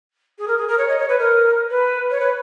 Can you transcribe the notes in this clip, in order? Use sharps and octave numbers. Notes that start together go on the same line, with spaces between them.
G#4
A#4
G#4
A#4
C#5
D#5
C#5
B4
A#4
B4
C#5
B4